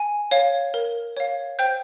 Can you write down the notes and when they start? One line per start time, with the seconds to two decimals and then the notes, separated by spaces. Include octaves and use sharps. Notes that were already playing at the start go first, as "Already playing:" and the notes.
Already playing: G#5
0.31 C#5 F5
0.74 A#4
1.17 C#5 F5
1.59 C5 G5 G6